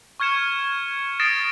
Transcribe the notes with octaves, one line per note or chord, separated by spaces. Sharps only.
C#6 F6 G#6 C#7 E7
D#6 A6 A#6 C7 D7 E7